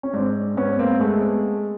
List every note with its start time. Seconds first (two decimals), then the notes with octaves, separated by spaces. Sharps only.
0.03 C#4
0.13 G#2 C4 D4
0.57 G#2 B3 C#4
0.79 A#3 C4
1.00 G#3 A3 B3